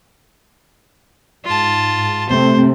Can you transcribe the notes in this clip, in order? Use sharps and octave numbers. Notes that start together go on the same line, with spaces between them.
G#2 F4 A5
C3 A3 C4 C5